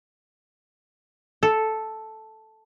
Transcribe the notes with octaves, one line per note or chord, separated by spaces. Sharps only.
A4